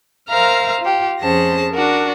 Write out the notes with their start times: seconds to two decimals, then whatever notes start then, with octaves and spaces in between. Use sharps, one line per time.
0.28 A#4 C5 E5 F5 A#5 F6
0.81 F4 G4
1.20 F2 C#4 G#4 C5 A5 A#6
1.72 D4 F#4 A#4